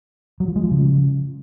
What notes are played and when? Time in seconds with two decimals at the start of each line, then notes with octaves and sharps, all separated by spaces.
0.40 F#3
0.48 F3
0.56 G#3
0.63 F3
0.71 C#3